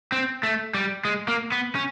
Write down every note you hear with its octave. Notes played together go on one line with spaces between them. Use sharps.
C4
A3
G3
G#3
A#3
B3
C#4